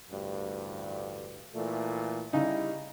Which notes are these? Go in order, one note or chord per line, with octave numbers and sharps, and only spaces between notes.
A1 D2 G2
A#2 E3 A3
C#3 G3 D#4 E4